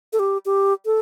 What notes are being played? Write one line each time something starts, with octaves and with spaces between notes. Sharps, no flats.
A4
G4
G4
A4